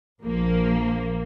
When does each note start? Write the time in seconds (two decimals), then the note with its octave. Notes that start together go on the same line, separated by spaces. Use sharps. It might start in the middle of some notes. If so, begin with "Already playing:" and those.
0.22 A#1 F3 A#3